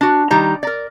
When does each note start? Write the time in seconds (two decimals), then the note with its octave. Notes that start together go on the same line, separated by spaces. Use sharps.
0.01 D4 F#4
0.31 D#3 G3 D#4 A#5
0.63 A#4 D5